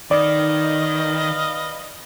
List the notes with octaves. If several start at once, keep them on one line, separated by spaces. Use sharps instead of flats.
D#3 B4 D5 D#5 F5